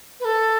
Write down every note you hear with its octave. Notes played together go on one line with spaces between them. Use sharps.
B4
A4